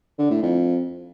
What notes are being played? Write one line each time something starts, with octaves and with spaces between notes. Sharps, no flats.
D3
A2
F2